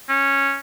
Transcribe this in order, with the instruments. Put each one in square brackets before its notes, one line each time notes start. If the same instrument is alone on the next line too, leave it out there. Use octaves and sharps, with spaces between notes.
[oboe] C#4